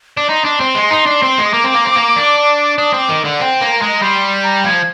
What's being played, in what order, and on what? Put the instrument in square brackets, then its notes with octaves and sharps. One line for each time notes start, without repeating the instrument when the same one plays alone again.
[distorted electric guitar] D4
[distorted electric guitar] D#4 [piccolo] C6
[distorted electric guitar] D4
C4
G#3
D#4
D4
C4
G#3
[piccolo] D#6
[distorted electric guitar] A#3 [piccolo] D6
[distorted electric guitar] C4
A#3
C4
A#3
D4
[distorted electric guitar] D4 [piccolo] D#6
[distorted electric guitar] C4
[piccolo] D6
[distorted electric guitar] D#3
D3
[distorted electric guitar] C4 [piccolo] G5
[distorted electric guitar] A#3
[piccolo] A#5
[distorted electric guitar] G#3
[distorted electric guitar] G3 [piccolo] C6
[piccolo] A#5
[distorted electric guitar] F3 [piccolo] G#6